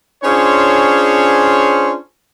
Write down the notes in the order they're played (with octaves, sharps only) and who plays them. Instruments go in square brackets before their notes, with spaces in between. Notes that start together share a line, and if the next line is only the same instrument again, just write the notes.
[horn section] C#4 D4 F4 G#4 C5 C#5